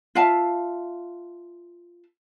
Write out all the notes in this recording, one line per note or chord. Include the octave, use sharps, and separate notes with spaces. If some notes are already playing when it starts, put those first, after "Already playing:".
F4 E5 F5 A5